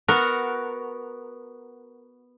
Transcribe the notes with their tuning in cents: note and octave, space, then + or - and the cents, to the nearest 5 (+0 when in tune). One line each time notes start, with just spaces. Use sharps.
B3 +0 F#4 -5 A#4 +0